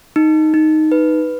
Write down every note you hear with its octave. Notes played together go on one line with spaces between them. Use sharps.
D#4
D#4
B4